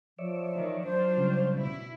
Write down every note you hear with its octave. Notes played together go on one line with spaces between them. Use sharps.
F3 C#5 D5 E5
D#3 E3
F#3 D4 F4 C5
C#3 G3 C#4
B2 E4